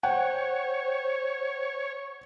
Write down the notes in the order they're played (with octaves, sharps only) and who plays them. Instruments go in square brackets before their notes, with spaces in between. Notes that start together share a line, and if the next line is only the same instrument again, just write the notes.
[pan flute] C5 [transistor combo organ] C#5 [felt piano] F#5 G5